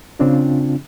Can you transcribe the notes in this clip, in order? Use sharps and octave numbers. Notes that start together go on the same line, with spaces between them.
C#3 C4 D4 F4